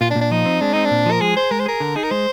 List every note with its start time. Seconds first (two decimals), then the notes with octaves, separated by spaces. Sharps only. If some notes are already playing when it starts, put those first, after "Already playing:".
0.01 A#2 F4
0.10 D4
0.16 A#2
0.21 D4
0.31 F3 D#4
0.46 C4
0.61 G#3 D4
0.73 C4 D#4
0.85 D4
0.91 A#2
1.06 F3
1.11 A#4
1.21 G#3 G#4
1.36 G#4 C5
1.51 G#3 A#4
1.59 C5
1.66 G#4 A#4
1.80 D3
1.96 D#4 G#4
2.03 A#4
2.11 G#3 C5